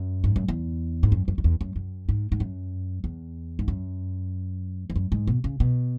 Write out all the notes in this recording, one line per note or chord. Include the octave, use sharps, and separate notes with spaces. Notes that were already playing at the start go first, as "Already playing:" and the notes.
Already playing: F#2
G#2
F#2
E2
G#2
F#2
F#2
F#2
E2
F#2
F#2
G#2
G#2
F#2
E2
G#2
F#2
E2
F#2
G#2
B2
C#3
B2